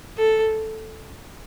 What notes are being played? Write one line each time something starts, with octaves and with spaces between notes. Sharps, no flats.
A4